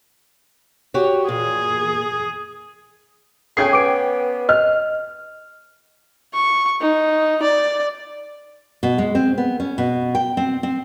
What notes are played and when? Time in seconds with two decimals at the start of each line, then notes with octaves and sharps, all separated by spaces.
0.94 F#4 G4 C#5
1.28 A#2 G#4
3.57 A3 C#4 G#4 G5 G#6 C7
3.73 B3 D6 D7
4.49 D#5 F6
6.33 C#6
6.81 D#4
7.42 D5
8.83 B2
8.98 G#3
9.15 C4
9.38 B3
9.60 C#4
9.78 B2
10.15 G5
10.37 C4
10.63 C4